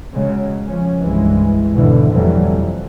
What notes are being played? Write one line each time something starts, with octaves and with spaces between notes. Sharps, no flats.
C#3 F#3 G#3
F3 C#4
C2 G2 E3 G#3
E2 G#2 B2 D3 E3
F2 C3 E3 F#3 G3 A3
F2